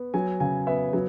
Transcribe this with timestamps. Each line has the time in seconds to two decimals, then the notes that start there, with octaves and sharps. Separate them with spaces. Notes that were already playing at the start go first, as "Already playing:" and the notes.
Already playing: B3
0.14 F#3 G#5
0.40 C#3 G#5
0.67 B3 E5
0.93 F#3